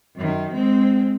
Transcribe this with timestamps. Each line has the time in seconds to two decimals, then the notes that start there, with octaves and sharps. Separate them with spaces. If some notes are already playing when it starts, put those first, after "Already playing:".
0.16 F#2 D#3
0.53 G#3 C4